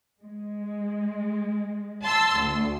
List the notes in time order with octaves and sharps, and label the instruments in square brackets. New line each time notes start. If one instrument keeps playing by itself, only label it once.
[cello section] G#3
[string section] A5 C6 E6
D2